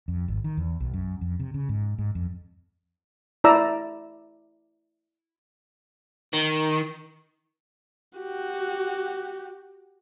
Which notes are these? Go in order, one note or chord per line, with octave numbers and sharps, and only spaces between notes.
F2
G#1
D#3
E2
B1
F#2
F2
C3
C#3
G#2
G#2
F2
E4 D5 A#5 E6
D#3
F#4 G4